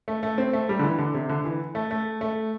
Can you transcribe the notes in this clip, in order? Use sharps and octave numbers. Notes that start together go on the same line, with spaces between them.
A3
A3
C4
A3
G3
D3
E3
D3
C3
D3
E3
A3
A3
A3